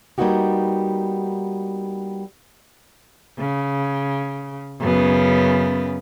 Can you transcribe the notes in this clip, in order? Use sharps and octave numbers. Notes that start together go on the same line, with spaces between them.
G3 A#3 B3 D#4 F#4 G4
C#3
F#2 C#3 B3